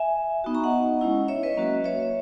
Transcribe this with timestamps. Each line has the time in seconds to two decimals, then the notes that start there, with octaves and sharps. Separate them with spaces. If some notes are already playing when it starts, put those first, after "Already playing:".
Already playing: E5 G#5
0.44 B3 D#4 F#4
0.55 A#5 C#6
0.63 D#5 F#5
1.01 G#3 C#4 E4
1.28 C#5 E5
1.43 B4 D#5
1.57 F#3 A#3 C#4 F#4
1.84 C#5 E5